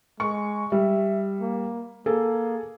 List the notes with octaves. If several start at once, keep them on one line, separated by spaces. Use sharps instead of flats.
G#3 C#6
G3 E5
A#3
A#3 G#4 A4